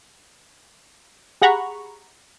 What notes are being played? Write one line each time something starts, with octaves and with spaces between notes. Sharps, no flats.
G4 G#4 F#5 A#5 B5 C#6